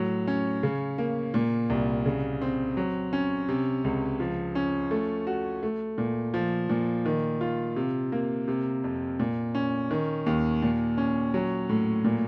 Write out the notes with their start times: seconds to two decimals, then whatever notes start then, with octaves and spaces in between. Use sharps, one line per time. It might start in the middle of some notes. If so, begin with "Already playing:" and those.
Already playing: A2 F#3
0.27 C#4
0.63 C#3
0.98 A#3
1.34 A#2
1.70 C2
2.06 C#3
2.41 C4
2.77 F#3
3.13 C#4
3.49 C3
3.84 C#2
4.20 F3
4.55 C#4
4.91 A3
5.27 F#4
5.63 A3
5.98 A#2
6.34 F3
6.69 A#2
7.06 D#3
7.41 F4
7.76 C3
8.12 A#3
8.48 C3
8.84 F2
9.20 A#2
9.55 C#4
9.91 D#3
10.26 D#2
10.62 A#2
10.98 C#4
11.34 F#3
11.69 A2
12.04 A#2